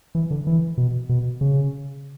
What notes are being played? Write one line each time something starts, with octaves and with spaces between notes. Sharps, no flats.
E3
D3
E3
B2
B2
C#3